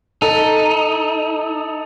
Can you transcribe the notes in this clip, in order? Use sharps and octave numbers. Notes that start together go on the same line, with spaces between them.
D#4 A4